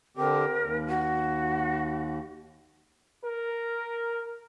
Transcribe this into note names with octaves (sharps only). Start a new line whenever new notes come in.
D3 C4 G4 A#4
D#2
F#4
A#4